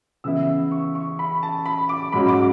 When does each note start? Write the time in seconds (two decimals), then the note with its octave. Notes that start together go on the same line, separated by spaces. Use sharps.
0.24 C#3 E3 B3 E4 E6
0.72 C#6
0.95 C#6
1.19 B5
1.43 A5
1.66 B5
1.89 D6
2.12 G#2 F#3 C#4 B5
2.28 D6